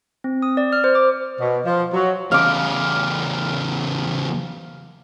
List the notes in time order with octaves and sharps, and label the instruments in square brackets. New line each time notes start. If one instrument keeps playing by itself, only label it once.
[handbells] C4
D#6
D5
F6
C5
D6
[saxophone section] B2
F3
F#3
[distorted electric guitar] E2 C#3 [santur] F5 D6